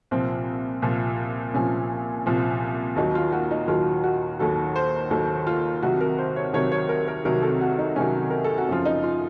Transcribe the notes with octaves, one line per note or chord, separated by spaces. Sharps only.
C2 A#2 F3 C4
C2 A#2 F3
C2 A#2 F3 C#4
C2 A#2 F3
D#2 D#3 F#3 D#4
F4
F#4
D#4
D#2 D#3 F#3 F4
F#4
D#2 D#3 F#3 A4
C5
D#2 D#3 F#3 A4
F4
C2 C3 D#3 F#3 F#4
A#4
C5
C#5
C2 C3 D#3 F#3 C#5
C#5
A#4
A#4
C2 C3 D#3 F#3 A#4
A4
F#4
D#4
C2 C3 D#3 F#3 C#4
A#4
A4
F#4
F#2 C#3 F3 F4
D#4
F4